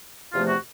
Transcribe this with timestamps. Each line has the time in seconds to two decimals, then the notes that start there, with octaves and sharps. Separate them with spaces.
0.33 E2 C3 F3 A3 F4
0.48 F#4